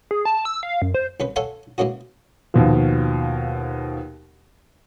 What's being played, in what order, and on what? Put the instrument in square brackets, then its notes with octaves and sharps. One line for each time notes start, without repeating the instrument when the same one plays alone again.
[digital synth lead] G#4
A5
E6
F5
F#2
C5
[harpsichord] C2 C#4 B4
A4 C#5 F5 F#5 G#5 C6
E3 G#3 A#3 C#4 F#4
[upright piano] D#2 B2 F3